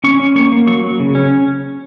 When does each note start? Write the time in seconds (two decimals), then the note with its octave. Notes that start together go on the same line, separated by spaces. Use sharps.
0.04 C#4 C#6
0.19 C#4
0.36 A#3 C#6
0.52 A#3
0.67 F#3 C#6
0.83 F#3
1.00 C#3
1.15 C#4